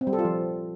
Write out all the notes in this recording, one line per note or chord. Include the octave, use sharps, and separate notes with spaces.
C4
G3
A4
F4
F3